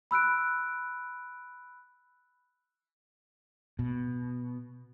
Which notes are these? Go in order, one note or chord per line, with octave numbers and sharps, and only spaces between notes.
B5 E6 F#6 D7
B2